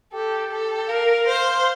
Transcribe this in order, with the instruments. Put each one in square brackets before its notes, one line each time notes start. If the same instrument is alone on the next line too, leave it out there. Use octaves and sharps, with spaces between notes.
[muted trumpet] G4 [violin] A4
[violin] A4
[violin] A#4 [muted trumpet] F5
[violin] C5